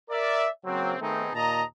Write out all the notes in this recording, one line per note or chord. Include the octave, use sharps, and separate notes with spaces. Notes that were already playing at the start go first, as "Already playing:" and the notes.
A#4 D5 E5
C#3 F#3 A#3 C4
D#3 A3 B3 C4 D#4 G#4
D#2 A#2 D#5 A5 A#5